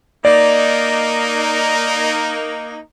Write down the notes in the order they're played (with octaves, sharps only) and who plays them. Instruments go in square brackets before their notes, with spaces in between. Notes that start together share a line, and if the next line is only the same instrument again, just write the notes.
[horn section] A#3 D#4 [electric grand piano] D5